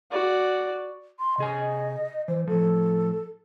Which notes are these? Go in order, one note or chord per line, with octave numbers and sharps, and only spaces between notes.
F#4 D5
C6
C3 G#4 D#5 G#5
E3 C5
A2 F3 A4